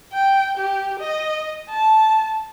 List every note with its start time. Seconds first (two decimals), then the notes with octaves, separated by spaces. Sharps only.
0.13 G5
0.57 G4
0.99 D#5
1.70 A5